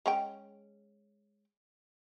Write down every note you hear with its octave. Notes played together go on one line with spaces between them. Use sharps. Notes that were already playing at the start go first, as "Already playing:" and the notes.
G#3 C#4 G5